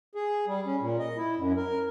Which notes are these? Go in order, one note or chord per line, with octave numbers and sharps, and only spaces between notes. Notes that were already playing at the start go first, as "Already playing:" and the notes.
G#4
G3
C#4
A#2
D#5
E4
F#2
A#4